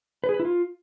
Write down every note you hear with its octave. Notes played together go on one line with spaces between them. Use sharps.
B4
G#4
B4
E4
F4